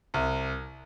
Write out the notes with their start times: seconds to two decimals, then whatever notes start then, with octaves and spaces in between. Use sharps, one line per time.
0.14 C2